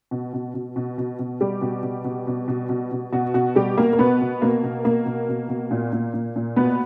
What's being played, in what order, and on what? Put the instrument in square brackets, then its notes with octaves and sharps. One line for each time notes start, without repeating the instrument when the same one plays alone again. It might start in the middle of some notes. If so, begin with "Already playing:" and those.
[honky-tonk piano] B2
B2
B2
B2
B2
B2
B2 G3 G4
B2
B2
B2
B2
B2
B2
B2
B2 F#4
B2 F#4
B2 G3 G4
B2 A#3 A#4
A#4
B2 B3 B4
B2
B2 A#3 A#4
B2
B2 A#3 A#4
B2
B2
B2
A#2
A#2
A#2
A#2
B2 B3 B4